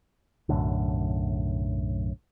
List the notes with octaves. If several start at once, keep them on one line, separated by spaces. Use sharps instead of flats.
B1 F#2 A2 D3